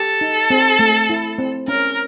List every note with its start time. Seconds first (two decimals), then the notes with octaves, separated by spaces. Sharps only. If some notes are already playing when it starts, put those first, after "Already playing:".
Already playing: G4 A4
0.21 D#4
0.50 C4
0.79 A3
1.10 E4
1.38 C4
1.68 C#4 A#4